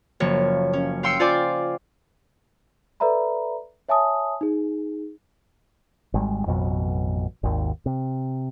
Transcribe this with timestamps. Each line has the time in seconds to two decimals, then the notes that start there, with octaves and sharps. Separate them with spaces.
0.20 F#1 F3 A#3 C#5
0.73 C#4
1.03 F5 G5 C6 E6 C7 C#7
1.20 F4 C5 D5 G5 G#5 D6
3.00 A4 B4 D5 E5 A#5 B5
3.89 C#5 E5 G#5 A5 D#6
4.41 D#4 G#4
6.14 G#1 G3 G#3
6.46 A1 F2 B2 F#3
7.43 G#1 D#2
7.86 C3